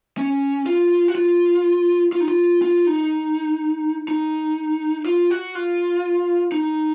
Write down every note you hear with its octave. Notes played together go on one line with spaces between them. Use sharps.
C#4
F4
F#4
F4
F4
D#4
F4
F4
D#4
D#4
F4
F#4
F4
D#4